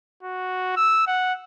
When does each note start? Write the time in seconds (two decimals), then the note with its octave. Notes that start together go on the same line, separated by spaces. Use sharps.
0.23 F#4
0.76 E6
1.07 F#5